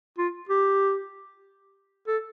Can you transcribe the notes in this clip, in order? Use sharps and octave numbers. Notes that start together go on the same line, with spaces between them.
F4
G4
A4